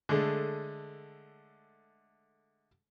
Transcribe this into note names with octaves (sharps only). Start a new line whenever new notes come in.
D3 G#3 A3